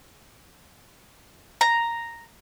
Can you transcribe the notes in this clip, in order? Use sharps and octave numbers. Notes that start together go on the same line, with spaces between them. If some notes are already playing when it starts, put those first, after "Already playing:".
A#5